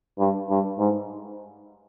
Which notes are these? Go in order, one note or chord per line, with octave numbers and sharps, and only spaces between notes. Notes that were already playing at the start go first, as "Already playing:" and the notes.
G2
G2
G#2